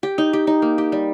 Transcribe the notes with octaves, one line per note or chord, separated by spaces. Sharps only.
G4
D#4
G4
D#4
A#3
G4
G3